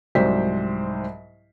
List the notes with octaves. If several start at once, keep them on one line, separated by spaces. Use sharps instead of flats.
C2 G#2 F#3 C5 D5 B6